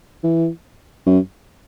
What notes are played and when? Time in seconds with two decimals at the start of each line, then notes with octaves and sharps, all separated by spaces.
0.24 E3
1.06 F#2